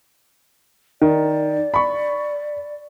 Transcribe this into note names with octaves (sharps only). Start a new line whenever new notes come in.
D#3 D5
B5 C#6